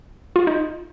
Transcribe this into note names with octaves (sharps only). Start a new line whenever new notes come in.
F4
D#4